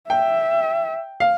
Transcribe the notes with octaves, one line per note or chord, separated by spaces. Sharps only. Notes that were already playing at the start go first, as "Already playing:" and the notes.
E5 G5
F5